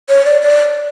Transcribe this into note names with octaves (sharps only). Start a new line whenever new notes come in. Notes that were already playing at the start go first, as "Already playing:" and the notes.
C#5
D5
D5